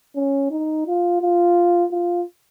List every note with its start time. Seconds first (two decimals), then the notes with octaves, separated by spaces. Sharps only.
0.16 C#4
0.51 D#4
0.87 F4
1.21 F4
1.91 F4